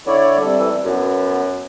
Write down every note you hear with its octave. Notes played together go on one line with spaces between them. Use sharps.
D3 E4 C#5 D5
C3 G3 A4
E3
F#2 B3